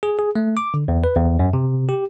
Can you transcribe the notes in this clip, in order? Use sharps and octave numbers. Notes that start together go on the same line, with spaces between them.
G#4
G#4
A3
D6
D3
E2
B4
E2
F#2
C3
G4